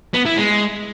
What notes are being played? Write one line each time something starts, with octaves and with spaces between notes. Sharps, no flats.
B3
E4
G#3